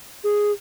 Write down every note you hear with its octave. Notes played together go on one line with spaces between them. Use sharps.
G#4